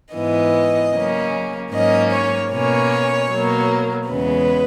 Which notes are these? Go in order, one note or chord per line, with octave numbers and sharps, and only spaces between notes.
G#2 E3 B3 D#5
C#3 F#3 A#3 C#4
G#2 F#3 A#3 C#4 D#5
C#5
B2 A#3 C#4 C#5
B2 F#3 A#3
E2 C#3 G#3 B3 B4